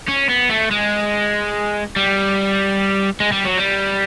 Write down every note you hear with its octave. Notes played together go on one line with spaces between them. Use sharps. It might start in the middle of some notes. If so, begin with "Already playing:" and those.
C#4
B3
A3
G#3
G3
G#3
G3
F#3
G3